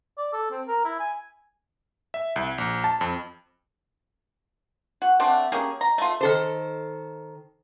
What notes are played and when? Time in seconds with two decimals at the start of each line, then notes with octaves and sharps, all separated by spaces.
0.18 D5
0.33 A4
0.51 C4
0.67 A#4
0.85 E4
1.00 G#5
2.14 E5
2.36 C2
2.58 A#1
2.84 A5
3.01 F2
5.02 F#4
5.20 A3 C4 D4 F#4
5.52 A#3 C#4 G4 G#4
5.81 A#5
5.98 A3 F4
6.21 D#3 A4 C5